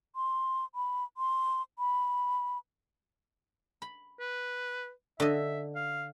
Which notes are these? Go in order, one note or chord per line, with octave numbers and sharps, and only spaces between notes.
C6
B5
C6
B5
B5
B4
D3 D#5 E5
F5